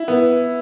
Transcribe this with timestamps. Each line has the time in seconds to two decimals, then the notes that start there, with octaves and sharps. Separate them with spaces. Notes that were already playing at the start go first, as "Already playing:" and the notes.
Already playing: E4
0.08 B3